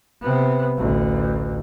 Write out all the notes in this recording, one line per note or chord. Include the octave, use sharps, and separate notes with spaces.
C3 B3
A1 D2